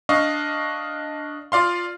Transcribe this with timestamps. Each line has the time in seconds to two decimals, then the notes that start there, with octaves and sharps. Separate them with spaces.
0.09 D4 D#5 F5 C#6
1.52 F4 D5 F5 C6